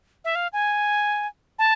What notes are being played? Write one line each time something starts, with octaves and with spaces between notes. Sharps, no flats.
E5
F5
G#5
A5